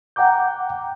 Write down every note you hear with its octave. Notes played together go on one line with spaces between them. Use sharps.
F#5 G5 A#5 D6 G6